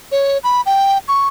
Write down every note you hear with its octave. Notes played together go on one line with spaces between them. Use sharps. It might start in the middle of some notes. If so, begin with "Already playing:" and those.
C#5
B5
G5
C#6